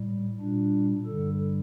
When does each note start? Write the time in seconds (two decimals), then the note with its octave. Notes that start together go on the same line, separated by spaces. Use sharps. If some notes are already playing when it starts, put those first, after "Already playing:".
Already playing: A2 G3
0.40 A#2 G3 D4
1.06 G2 D3 G3 A4